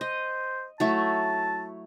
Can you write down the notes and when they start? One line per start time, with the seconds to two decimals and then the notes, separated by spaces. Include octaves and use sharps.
0.01 C5 D#5
0.80 F#3 A3 E4 A5